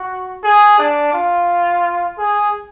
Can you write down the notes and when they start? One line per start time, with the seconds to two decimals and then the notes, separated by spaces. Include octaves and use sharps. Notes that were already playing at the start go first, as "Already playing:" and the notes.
Already playing: F#4
0.43 G#4
0.78 D4
1.13 F4
2.18 G#4